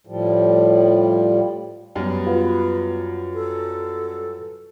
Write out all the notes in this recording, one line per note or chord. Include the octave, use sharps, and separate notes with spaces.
A2 F3 G3
F#2 G3 B3
F4 F#4 B4
A4